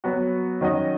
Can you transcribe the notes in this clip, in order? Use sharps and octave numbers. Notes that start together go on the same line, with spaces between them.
F#3 B3 F#4
D#3 F#3 C#4 F#4 D#5